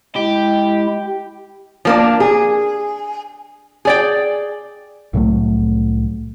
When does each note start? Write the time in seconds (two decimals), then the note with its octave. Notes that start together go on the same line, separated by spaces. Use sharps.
0.16 G#3 E4 G4
1.85 F3 A#3 D4
2.20 G#4
3.85 G#4 D5 G5
5.13 C2 A2 F#3 A3